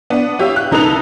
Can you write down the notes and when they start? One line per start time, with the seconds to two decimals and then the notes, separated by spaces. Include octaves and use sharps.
0.10 B3 D4
0.39 E4 G4 C#5 E5 F5
0.56 F#6
0.71 C2 D#4 A4 B4 F7